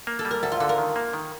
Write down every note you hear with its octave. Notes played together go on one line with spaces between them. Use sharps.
A#3
A4
G3
A#4
D2 A4
F4
D3 A4
A#4
D#3
A#3
D#3